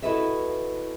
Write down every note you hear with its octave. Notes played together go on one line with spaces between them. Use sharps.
E4 F#4 A4 B4 D#5 E5